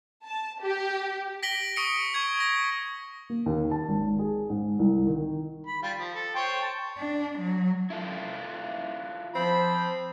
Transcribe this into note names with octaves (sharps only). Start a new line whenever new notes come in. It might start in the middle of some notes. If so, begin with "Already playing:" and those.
A5
G4
A#6 B6 D7 F#7 G7
C#6 D#6 C#7 D7
C#6 G#6
A#6
A#3
D#2
A5
G#1
G#4
G#2
C2
D#3
B5
G3 F4
F3
A4
C5 C#5 G5
A5
D4
F#3
E4 F4 A4
F3 C4 B5